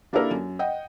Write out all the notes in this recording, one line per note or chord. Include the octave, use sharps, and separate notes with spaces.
A#3 D4 E4 G4 A4 A#4
F#2
D#5 F#5 G5